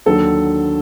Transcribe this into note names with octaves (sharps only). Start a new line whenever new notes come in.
D#2 D3 F#3 A4